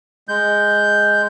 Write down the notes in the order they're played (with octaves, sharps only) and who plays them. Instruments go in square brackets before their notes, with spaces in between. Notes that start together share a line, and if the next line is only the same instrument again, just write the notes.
[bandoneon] G#3 G6